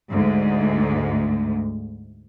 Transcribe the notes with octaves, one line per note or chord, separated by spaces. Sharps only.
D2 G#2